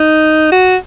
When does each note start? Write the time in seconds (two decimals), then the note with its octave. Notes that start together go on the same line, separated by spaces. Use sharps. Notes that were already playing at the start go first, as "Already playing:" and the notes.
Already playing: D#4
0.52 F#4